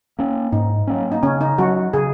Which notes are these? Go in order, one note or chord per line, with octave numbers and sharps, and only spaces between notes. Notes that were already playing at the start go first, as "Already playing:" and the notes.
A#3 C#4
G#2 D#4
F#3 A#3 C#4
D#4
C#3 C#4
D#4
F#3 C#4 F#4
C#3 G#4